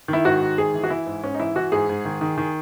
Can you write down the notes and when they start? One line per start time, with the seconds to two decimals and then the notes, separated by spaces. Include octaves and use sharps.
0.08 D#3 E4
0.25 G#2 F#4
0.42 D#3
0.58 G#2 G#4
0.74 E3
0.84 F#4
0.90 E3 E4
1.06 G#2
1.24 G#2 C#4
1.34 D#4
1.40 E3 E4
1.56 E3 F#4
1.72 G#2 G#4
1.89 G#2
2.05 D#3
2.21 D#3
2.38 D#3